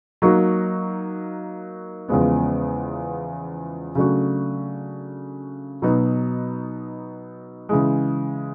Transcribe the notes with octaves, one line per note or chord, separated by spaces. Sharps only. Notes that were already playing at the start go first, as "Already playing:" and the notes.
F#3 A#3 D#4 F#4
E2 C#3 F3 G#3 B3
C#3 F#3 A3 D4 F#4
B2 F#3 B3 D#4
C#3 E3 G#3